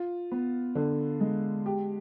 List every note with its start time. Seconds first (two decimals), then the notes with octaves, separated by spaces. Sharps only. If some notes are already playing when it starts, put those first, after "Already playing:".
Already playing: F4
0.32 B3
0.75 D3
1.20 G#3
1.66 G4